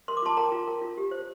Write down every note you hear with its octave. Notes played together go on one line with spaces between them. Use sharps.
A#4 C6
D6
F4 A5 C6
A#4 G5 A#5
F4
A#4
F4
G4
C5